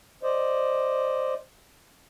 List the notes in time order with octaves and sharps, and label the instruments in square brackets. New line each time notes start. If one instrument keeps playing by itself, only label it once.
[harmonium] C5 D5 D#5